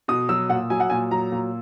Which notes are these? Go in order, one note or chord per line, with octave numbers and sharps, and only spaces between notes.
B2 D#6
F#3 E6
A#2 F#5
F#3 G#5
F#5
A#2 G#5
F#3 A#5
A#2